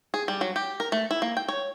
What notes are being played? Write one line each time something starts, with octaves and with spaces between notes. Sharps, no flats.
G#4
G3
F#3
G4
A#4
A3
E4
A#3
G5
C#5